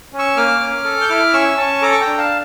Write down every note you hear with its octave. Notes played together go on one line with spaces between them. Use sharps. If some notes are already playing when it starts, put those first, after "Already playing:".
C#4
C#6 E6
A#3 D6 F6
C#4
A4
G6
E4 D6 F6
C#4 C#6 E6
C#4 A5 C#6
A4 A#5 D6
C#6
G5 A#5
D4
F5 A5